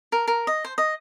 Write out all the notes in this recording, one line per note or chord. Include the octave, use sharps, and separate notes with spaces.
A#4
A#4
D#5
C5
D#5